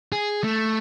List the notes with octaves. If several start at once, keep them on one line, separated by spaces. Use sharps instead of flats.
G#4
A3